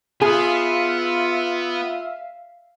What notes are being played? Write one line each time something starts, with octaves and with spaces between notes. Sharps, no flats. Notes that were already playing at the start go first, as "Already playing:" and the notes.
B3 F4 G#4 E5 F5